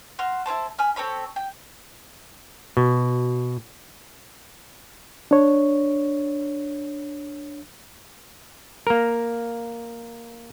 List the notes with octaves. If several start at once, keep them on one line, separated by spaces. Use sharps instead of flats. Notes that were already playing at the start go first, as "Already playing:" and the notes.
F#4 C6 F6
E4 A#4 C5 A5
G#5 B5 F6
C4 A4 C#5 B5
G5
B2
D4 C#5
A#3 A#4